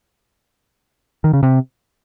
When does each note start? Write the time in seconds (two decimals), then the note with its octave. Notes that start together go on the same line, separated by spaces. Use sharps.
1.24 D#3
1.33 C#3
1.43 C3